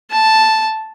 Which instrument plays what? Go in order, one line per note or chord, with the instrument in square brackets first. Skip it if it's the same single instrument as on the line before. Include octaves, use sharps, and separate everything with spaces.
[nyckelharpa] A5